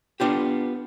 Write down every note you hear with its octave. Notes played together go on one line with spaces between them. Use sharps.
B3 D4 F4 G4